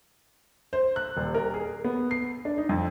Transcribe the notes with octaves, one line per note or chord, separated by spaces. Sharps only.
C5
F#6
D#1
A#4
G#4
B3
C7
D4
D#4
F2